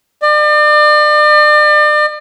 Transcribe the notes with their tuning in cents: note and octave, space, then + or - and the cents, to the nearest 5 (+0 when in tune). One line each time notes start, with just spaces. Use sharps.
D5 +40